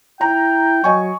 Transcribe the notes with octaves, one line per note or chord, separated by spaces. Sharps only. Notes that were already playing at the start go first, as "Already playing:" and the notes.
E4 G5 A#5
F#3 D#5 G#5 C#6